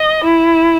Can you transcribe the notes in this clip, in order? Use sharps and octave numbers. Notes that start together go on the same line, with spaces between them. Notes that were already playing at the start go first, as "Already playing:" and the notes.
Already playing: D#5
E4